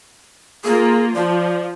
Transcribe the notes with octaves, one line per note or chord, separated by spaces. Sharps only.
A#3 F4 G#4
F3 D5